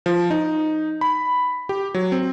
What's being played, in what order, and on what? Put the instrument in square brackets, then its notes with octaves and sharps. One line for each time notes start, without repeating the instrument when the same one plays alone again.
[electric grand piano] F3
D#4
B5
G4
F#3
C4